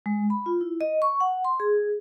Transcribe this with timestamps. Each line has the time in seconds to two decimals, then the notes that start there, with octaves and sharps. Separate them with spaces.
0.06 G#3
0.30 B5
0.46 F4
0.61 E4
0.81 D#5
1.02 C#6
1.21 F#5
1.45 C6
1.60 G#4